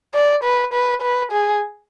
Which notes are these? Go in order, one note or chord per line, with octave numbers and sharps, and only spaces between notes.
D5
B4
B4
B4
G#4